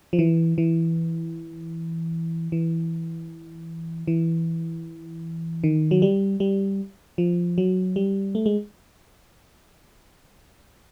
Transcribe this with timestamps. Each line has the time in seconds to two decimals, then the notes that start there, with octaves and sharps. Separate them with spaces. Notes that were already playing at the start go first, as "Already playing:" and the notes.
0.13 F3
0.19 E3
0.58 E3
2.52 E3
4.07 E3
5.64 D#3
5.91 F#3
6.02 G3
6.40 G3
7.18 F3
7.58 F#3
7.96 G3
8.35 A3
8.46 G#3